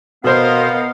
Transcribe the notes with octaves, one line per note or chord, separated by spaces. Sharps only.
B2 B3 A#4 C5 D#5 F5